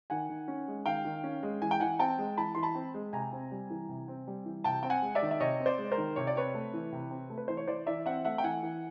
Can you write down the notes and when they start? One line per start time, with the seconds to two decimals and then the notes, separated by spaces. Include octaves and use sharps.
0.10 D#3 F#5 G#5
0.29 D#3
0.48 C#4
0.68 G#3
0.86 D#3 F5 G5
1.05 D#3
1.24 C#4
1.43 G#3
1.62 E3 G#5
1.71 G5
1.80 E3 F#5 G#5
1.99 C4 G5 A5
2.18 G#3
2.37 E3 A5 B5
2.55 E3 C6
2.63 A5 B5
2.75 C4
2.94 G#3
3.13 C3 G#5 A#5
3.32 C4
3.52 G3
3.70 E3
3.89 C3
4.08 C4
4.27 G3
4.45 E3
4.64 C3 G5 A5
4.83 C4 G5
4.90 F#5 G#5
5.02 G#3
5.15 D5 E5
5.22 D#3
5.31 E5
5.40 C3 C#5 D#5
5.60 C4
5.66 C5 D5
5.78 G#3
5.92 A#4 C5
5.98 D#3
6.16 C3 C#5
6.27 D5
6.36 C4 B4 C#5
6.54 A3
6.74 E3
6.92 C3
7.11 C4
7.30 A3
7.38 B4
7.48 E3 C5
7.57 C#5
7.67 E3 C5 D5
7.86 E3 D5 E5
8.06 C4 E5 F#5
8.25 A3 E5 F#5
8.38 G5
8.43 E3 F#5 G#5
8.63 E3